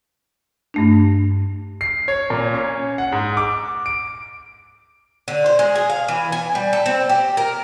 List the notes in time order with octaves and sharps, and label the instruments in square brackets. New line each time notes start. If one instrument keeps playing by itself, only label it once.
[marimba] G2 A3 D4
[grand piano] C7
C#5
A#2
C#4
F#5
G#2
D6
D7
[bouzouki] D3
C5
G#3
G#4
F5
E3
G#5
G3
A4
C4
G4
A#4